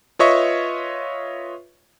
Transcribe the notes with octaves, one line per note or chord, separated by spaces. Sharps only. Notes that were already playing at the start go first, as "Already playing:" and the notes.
F4 B4 C#5 D#5 E5 C#6